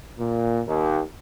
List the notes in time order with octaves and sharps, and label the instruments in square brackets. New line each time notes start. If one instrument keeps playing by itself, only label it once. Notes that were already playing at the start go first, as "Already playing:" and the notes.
[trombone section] A#2
D#2